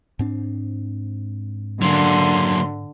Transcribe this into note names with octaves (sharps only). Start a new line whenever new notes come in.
G#2 C4 D4
D3 F#3 A#3 C6